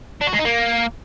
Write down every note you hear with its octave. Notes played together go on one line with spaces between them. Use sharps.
D4
F#4
G#3
D#4
A#3